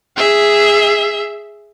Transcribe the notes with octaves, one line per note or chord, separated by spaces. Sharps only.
G#4 E5